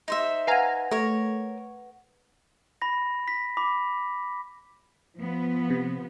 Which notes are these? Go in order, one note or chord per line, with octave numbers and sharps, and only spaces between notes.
D#4 C5 E5
B4 F5 F#5 G#5 A#5
A3 A#4 C#5
B5 A#6
B6
B5 D6
F3 B3
C3